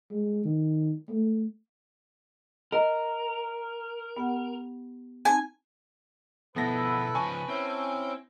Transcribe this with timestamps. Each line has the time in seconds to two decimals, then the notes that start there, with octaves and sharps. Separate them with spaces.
0.11 G#3
0.45 D#3
1.09 A3
2.72 A#4 D#5
4.17 B3 G4 F#5
5.25 C4 D#4 G#5
6.56 B2 D3 F3 B3 E4 A4 B4 A#6
7.15 C#3 F3 G#5 A5 C#6
7.48 C4 C#4 E4 G6